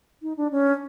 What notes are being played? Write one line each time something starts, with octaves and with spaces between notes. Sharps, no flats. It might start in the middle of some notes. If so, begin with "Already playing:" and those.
D#4
D4
C#4